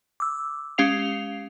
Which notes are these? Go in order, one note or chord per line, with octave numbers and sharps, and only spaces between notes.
D6 E6
G#3 C#4 G4 F5 C7 F7